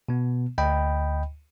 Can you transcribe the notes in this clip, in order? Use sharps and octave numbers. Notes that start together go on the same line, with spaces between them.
B2 B3
D2 D#5 G5 B5